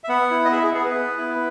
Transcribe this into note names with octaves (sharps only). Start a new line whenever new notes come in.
E5
B3 F#5
E4
D#5
G#4 E5
G#4
B3 G#4
B4
B3
E4